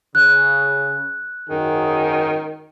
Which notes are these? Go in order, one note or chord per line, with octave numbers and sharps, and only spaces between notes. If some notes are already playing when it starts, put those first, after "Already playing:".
C#3 F#6
G#1 F#2 D#3 G#4